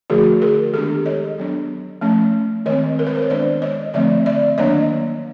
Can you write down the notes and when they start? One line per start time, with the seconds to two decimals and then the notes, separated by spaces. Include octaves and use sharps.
0.10 D3 F3 A3 F#4 G#4
0.42 G#4 A#4
0.73 D#3 G#3 B3 D4 G4 A4
1.06 C#5 D#5
1.38 F#3 B3 D4
2.01 F3 A3 C#4
2.66 D#3 G#3 C4 C#5 D#5
2.99 A#4
3.07 B4
3.15 C5
3.22 C#5
3.30 D#3 G#3 B3 D4 C5 D5
3.62 C#5 D#5
3.94 D3 F3 A3 C4 D5 E5
4.26 D5 E5
4.58 D#3 F#3 A#3 D4 C#5 D#5